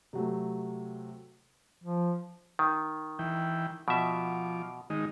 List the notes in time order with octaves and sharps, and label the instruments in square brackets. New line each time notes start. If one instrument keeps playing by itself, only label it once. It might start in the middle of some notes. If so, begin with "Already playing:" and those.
[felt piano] C3 F#3 A3
[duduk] F3
[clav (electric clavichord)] D#3
[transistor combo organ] E3 G5
[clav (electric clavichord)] B2 E5 [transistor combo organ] F3 D6
[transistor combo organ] D#3 G#3 D#4